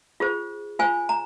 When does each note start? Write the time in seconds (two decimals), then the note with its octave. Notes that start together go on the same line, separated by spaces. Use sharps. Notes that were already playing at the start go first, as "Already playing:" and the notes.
0.20 F4 G#4 C5
0.79 F4 C5 G#5
1.09 A#5